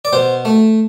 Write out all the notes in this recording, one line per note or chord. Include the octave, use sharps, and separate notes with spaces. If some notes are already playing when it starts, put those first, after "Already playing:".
D5
B2 C5
A3